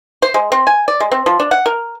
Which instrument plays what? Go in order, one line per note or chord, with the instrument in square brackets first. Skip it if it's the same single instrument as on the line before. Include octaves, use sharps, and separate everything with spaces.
[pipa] C5
G#3
C4
G#5
D5
G#3
C4
F3
D4
F#5
A#4